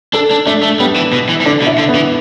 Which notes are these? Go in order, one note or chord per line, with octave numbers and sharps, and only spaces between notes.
D4 A4
D4
A3 D4
A3
G3 B3
E3
B2
E3
E3
D3 D4
B2
E4
D3
B3
E3